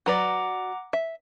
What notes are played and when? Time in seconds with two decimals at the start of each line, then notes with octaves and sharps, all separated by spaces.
0.06 F#3 B4 D5 F#5 A#5 D6
0.93 E5